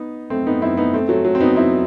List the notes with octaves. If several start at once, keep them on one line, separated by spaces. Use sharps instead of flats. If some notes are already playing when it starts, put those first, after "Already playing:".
Already playing: B3 D#4
A3 C4
B3 D#4
C4 E4
B3 D#4
A3 C4
F#3 A3
F#3 A3
C4
B3 D#4
C4 E4